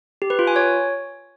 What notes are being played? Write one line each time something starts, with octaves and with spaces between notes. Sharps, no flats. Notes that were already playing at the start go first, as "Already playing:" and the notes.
G4
B4
F4
G#5
C#5